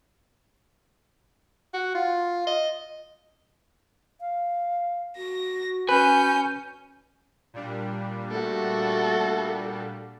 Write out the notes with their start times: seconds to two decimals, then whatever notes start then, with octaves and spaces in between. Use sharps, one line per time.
1.74 F#4
1.95 F4
2.47 D#5
4.20 F5
5.17 F#4 A#6
5.89 C#4 B4 G#5 G6
7.54 A#2 G3 D4
8.31 A3 F#4 A4